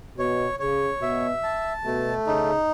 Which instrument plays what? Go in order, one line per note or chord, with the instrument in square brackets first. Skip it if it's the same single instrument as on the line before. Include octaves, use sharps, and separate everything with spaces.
[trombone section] B2 [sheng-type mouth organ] C#5
[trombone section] C#3 [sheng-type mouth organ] C#5
[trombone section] B2 [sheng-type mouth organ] E5
[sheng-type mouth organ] A5
[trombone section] B2 [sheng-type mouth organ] A3
[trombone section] C#3 [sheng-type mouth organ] D#4